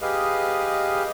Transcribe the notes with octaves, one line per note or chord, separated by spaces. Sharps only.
G4 G#4 B4 D#5 F5